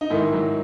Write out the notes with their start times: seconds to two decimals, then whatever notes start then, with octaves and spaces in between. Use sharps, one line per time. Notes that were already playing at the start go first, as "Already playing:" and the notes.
0.01 D#4
0.10 G#2 D#3 E4
0.33 F#3